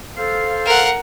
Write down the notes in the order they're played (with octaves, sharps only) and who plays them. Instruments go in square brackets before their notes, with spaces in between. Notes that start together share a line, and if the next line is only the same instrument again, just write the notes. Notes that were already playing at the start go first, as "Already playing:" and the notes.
[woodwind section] A4 C5 F5
[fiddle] A#4 F#5